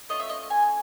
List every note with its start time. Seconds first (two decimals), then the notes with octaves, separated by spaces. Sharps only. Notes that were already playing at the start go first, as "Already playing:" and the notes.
0.09 A3 C#4 F4 D#5
0.20 E5
0.29 D#5
0.50 G#5